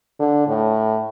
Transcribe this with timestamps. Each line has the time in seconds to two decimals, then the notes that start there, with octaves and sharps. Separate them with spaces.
0.20 D3
0.47 A2